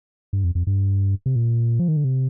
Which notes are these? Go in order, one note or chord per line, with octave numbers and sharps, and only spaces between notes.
G2
F2
F2
G2
C3
A#2
F3
D#3
D3
C3